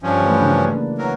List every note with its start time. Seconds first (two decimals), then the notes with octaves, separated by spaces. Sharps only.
0.03 G2 F3 C#4
0.21 E3 A3 B4
0.40 C#3 D4 A#4
0.67 A#3
0.98 E3 F#3 A#4